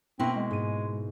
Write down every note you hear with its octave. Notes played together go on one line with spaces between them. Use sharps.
B2 A#3 C4 E4
G#3
G#2 D#7